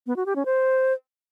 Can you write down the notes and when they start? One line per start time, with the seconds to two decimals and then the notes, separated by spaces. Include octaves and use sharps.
0.07 B3
0.16 F#4
0.26 G4
0.36 C#4
0.45 C5